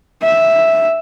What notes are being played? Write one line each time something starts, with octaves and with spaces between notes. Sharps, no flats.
E5